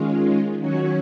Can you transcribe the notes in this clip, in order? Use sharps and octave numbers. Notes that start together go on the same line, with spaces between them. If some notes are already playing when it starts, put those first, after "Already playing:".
Already playing: D#3 G#3 C#4 F4
D#3 F#3 C#4 F#4 C#5